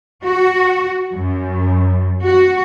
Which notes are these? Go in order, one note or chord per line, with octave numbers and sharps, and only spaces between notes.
F#4
F#2
F#4